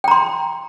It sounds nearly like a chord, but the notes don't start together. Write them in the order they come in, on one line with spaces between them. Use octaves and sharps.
G5 A#5 C6